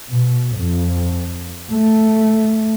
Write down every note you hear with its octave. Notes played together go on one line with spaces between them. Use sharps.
B2
F2
A3